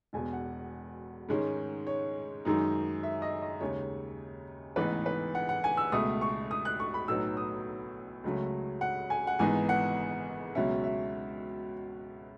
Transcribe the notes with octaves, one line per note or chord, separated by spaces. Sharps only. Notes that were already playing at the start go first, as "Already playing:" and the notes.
E1 E2 B2 G#5
F#5
G#2 D#3 G#3 C#4
C#5
F#2 D#3 G#3 D#4
E5
D#5
D#5
D#2 C#3 G#3 C#5
A1 G#2 E3 B3 D#4 B4
B4
F#5
F#5
G#5
E6
C#2 B2 A3 D#6
C#6
D#6
F#6
C#6
B5
B1 A2 F#3 B3 D#4 E6
D#6
C#2 C#3 F#3 A3
F#5
G#5
F#5
G#1 G#2 E3 B3 D#4 G#5
F#5
C#2 B2 F#3 C#4 E5
E5